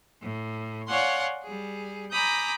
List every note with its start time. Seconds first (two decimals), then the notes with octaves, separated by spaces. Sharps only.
0.22 A2
0.88 C#5 D5 F5 F#5 G#5 C6
1.43 G3 G#4
2.12 G#5 A#5 B5 D6 D#6 G6